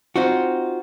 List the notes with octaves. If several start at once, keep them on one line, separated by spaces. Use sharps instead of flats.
C4 D#4 F4 F#4